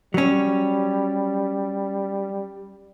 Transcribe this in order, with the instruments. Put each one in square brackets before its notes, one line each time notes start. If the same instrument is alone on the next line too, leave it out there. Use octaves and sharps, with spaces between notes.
[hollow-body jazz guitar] F#3 C#4 [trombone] G3